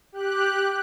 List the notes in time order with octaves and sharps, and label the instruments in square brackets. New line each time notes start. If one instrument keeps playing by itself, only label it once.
[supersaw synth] G4 F#6